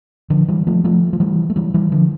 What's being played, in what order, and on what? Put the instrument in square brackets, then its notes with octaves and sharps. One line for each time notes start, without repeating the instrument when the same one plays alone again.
[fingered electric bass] D3 F3
E3 G3
F3 A3
F3 A3
F3
E3 G3
A3
E3 G3
E3 G3
D3 F3